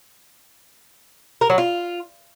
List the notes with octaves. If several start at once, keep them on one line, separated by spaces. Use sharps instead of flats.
A#4
F#3
F4